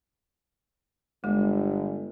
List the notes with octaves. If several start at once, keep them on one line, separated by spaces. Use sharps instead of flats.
G1 G#3